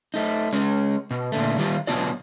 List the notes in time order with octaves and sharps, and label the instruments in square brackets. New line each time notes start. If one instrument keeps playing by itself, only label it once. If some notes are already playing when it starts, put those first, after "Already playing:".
[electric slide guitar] A3 D#4
G#3 C#4
B2
A#2 D3 A3
D#3 G3 F4
B2 F#3 B3 D4 F4 D5